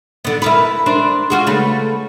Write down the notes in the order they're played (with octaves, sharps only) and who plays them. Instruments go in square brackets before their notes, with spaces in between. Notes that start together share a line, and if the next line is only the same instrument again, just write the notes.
[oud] D3 B3
E4 A#4 B4
D4 A#4 C5
F4 F#4 G#4
C#3 A3 B4